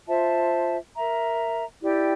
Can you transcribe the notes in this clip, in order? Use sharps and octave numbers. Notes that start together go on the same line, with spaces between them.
F4 C5 E5 A5
A#4 E5 A#5
E4 G4 D5 G5